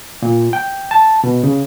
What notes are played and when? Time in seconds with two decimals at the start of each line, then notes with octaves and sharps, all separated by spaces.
0.22 A#2
0.53 G5
0.91 A5
1.24 B2
1.44 C#3